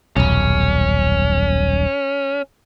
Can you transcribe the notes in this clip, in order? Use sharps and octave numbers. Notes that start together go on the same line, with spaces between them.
D#1 B1 C#4